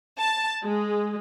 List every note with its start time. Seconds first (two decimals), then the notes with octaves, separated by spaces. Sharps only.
0.18 A5
0.64 G#3